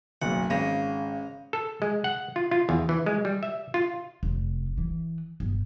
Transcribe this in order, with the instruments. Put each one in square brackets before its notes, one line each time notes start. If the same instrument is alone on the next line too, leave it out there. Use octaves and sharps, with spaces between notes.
[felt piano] F#1 B1 [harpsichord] F#5
[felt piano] G#1 A#6 [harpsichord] C#3
[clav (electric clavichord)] A4
G#3
F#5
F4
F4
E2
E3
G#3
G3
E5
F4
[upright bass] F1
E3
G1